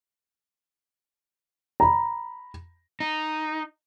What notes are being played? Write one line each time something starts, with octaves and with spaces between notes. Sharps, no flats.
A#5 B5
D#4